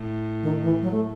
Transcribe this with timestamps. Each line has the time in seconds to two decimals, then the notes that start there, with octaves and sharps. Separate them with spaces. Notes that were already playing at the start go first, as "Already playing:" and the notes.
Already playing: A2
0.42 D#3
0.62 E3
0.82 F#3
0.91 A3